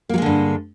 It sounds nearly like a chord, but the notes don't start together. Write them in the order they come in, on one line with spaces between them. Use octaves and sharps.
A#3 F#3 G#3 D3 G2